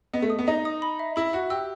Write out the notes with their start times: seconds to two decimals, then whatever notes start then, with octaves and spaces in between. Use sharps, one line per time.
0.13 B3 D#5
0.22 A3
0.30 D#6
0.39 B3
0.47 D#4 D#5
0.65 D#6
0.82 B5
0.99 E5
1.16 E4 B5
1.33 F#4 E5
1.50 G4 E6